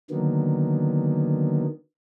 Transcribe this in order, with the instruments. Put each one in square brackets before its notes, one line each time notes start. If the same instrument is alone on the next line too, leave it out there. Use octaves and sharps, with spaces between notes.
[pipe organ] D3 D#3 F#3 A#3 B3